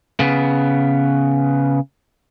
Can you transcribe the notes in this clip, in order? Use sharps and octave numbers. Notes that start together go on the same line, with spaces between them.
C#3 B3